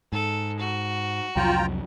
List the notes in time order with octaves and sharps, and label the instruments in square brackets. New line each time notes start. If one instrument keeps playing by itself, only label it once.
[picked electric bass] G#2 [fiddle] A4
[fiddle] F#4
[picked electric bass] C2 F2 F#3 [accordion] F4 G5 A#5